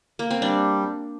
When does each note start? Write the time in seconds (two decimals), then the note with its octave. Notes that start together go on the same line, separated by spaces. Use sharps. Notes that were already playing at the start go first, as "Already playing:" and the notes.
0.19 A#3
0.31 C4
0.42 G3 D4